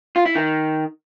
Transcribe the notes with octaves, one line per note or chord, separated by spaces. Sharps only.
F4
E4
D#3